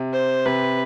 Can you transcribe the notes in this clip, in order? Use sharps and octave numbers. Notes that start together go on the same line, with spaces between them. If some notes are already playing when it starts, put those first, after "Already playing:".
Already playing: C3
C5
C3 B4